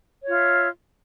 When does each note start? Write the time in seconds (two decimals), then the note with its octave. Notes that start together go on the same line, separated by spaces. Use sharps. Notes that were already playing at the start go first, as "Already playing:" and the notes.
0.24 C#5
0.28 F4
0.31 E5